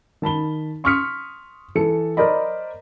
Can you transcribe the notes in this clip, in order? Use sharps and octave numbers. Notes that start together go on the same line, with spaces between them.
D#3 A5 B5 G7
C6 C#6 D#6 F6 B6 C#7
E3 A4 C#7
A#4 C5 D5 D#5 B5